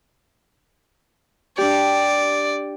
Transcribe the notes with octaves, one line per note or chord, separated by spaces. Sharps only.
D4 G4 D5